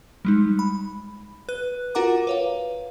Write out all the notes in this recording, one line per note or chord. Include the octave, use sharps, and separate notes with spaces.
G3 G#3 D#4
B5
B4 F#6
F4 F#4 A#4 F#5 A#5 D6
B4 C#5 F5